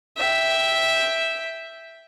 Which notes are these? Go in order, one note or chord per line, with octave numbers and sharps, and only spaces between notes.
E5 G5